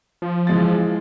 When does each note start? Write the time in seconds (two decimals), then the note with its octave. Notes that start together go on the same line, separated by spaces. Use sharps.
0.22 F3
0.47 E3 G#3 A6